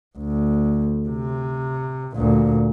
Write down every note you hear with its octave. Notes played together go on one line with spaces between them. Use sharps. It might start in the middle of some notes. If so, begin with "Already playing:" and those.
D2
C3
D2 A#2